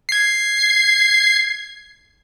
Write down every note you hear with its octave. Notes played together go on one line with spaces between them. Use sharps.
G#6 C7